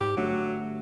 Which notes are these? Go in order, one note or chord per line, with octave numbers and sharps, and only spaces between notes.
G#2 G4
G1 F#3 A3 D4